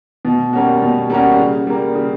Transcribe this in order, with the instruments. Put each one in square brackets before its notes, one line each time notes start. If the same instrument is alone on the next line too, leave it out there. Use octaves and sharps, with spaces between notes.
[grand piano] B2
G3 A#3 C#4 F#4
B2
G3 A#3 C#4 F#4
C#3
G3 A#3
C#3